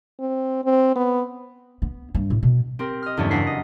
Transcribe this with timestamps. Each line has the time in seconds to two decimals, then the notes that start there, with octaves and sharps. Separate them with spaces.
0.19 C4
0.65 C4
0.96 B3
1.82 B3
2.15 G2
2.30 A2
2.43 B2
2.79 C4 G4 A#4
3.02 D#5 F6
3.17 F#1 E2 G2 A3 C#4 D4
3.30 F#1 D4 F#5 A#5 B6 C7
3.47 D#5